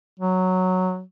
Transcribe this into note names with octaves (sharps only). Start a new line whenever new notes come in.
F#3